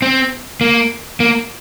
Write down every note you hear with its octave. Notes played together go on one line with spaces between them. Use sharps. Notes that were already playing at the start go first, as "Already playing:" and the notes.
C4
A#3
A#3